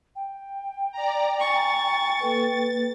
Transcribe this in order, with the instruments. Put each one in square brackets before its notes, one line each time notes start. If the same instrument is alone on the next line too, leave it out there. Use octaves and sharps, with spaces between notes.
[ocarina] G5
[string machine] D5 A#5
[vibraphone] G#5 A#5 [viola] C#6 [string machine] A6
[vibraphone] A#3 A4 B4